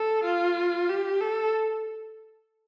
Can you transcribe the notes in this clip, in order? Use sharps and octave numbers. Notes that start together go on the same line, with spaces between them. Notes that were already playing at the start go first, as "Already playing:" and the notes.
Already playing: A4
F4
G4
A4